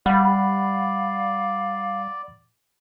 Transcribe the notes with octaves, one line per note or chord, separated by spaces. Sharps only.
G3 D5 F5 F#5 B5